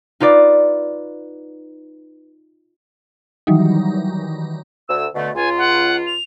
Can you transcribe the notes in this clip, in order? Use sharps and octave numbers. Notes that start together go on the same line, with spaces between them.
D#4 F4 B4 D5
D#3 E3 F#3 G3 D#4
D2 E6
B2 D3 A3
C#2 F4 G#5
F#5
F7